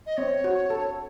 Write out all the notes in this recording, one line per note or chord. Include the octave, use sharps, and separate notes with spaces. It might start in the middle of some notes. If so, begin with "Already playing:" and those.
D#5
C4 C#5
F#4
A4